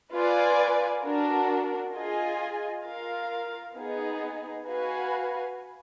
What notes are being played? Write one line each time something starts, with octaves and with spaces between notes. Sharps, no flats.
F4 B4 D5 G#5
D4 F#4 A#4
F4 G#4 D#5 G#5
F4 A#4 F5
B3 D#4 G#4
F#4 B4 F5 G#5